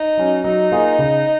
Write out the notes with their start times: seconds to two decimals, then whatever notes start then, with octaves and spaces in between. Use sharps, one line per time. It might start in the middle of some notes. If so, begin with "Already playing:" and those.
Already playing: D#4
0.17 F#3 C#4
0.44 F#3 D#4
0.72 A#3 F4 G#4
0.99 C#3